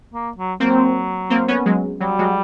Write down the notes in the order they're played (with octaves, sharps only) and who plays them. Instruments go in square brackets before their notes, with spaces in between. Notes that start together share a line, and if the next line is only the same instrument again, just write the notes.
[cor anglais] A#3
F#3
[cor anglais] F#3 [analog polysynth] A#3 C4
[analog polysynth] A#3 C4
B3 C#4
F#3 G#3
[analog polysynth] F#3 [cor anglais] G3
[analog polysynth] F#3 G#3